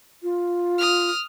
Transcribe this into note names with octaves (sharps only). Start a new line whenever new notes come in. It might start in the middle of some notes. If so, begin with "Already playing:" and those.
F4
D#6 F6